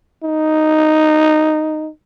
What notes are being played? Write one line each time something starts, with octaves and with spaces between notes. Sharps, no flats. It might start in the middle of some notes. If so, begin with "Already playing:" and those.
D#4